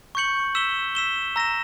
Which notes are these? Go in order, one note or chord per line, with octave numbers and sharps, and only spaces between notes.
C#6 G6 C#7 F#7
E6 B6 E7 G7
E6 B6 E7 G7
A#5 E6 A#6 E7